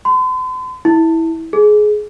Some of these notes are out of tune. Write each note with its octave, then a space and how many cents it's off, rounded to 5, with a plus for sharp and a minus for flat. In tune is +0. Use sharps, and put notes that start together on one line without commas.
C6 -45
E4 -15
G#4 +20